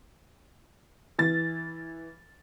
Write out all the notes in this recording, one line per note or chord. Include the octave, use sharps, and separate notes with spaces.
E3 A6